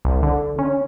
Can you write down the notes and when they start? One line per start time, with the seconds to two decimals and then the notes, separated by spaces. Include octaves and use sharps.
0.05 C2
0.23 D3
0.59 C#4